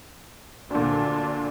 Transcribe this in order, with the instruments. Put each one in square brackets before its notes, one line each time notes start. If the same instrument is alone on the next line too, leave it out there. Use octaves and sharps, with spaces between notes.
[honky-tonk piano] D2 A#2 [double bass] D3 D4